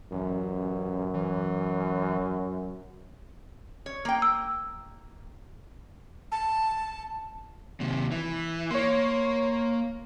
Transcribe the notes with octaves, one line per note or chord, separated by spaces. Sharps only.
A1 F#2
E3
C#5
A#3 G5
E6
A5
D#2 C3
E3
A#3 C#5 C6